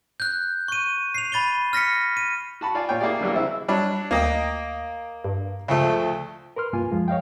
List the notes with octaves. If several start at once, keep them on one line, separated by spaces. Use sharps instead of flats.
F#6 G6
C#6 D#7
C7 F7
B5 A6 D#7 G7
F6 A#6 B6 C#7
D#7
F#4 A5 B5
F4 D5 F5 G#5
A#2 F4 C#5 G5
A#3 E4 G4 G#4 D5
D3 E3 F#3 G3 A#3
C#3 C4 E4 E6
F#3 G3 D4
D2 A#3 D#5 G5
G2
D2 C#3 F3 A3
A#4 B4 C6 F6
C2 G2 A#3 F4 G#5
F#2 F3 G#3 F4
C#5 D#5 F5 G5